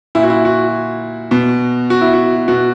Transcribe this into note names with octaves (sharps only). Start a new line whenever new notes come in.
A#2 E4
F#4
E4
F#4
B2
F#4
E4
F#4
B2 F#4